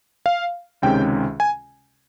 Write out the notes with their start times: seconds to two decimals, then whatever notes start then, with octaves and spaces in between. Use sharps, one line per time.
0.26 F5
0.82 C#2 C3 D#3 G#3 C#4 G5
1.40 G#5